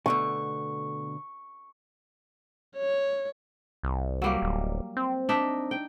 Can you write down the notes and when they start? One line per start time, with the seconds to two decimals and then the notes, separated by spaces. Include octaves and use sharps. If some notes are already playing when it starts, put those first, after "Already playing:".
0.06 B2 D3 A3 C#6
2.77 C#5
3.83 C2
4.22 F#3 G3 A#3
4.42 D1
4.97 C4
5.29 D4 D#4 E5
5.71 G5